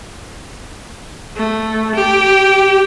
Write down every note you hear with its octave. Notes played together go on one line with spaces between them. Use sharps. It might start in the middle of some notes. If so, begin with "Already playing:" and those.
A3
G4